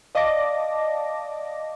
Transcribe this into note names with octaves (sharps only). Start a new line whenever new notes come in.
D5 D#5 F5 A5 D6 A#6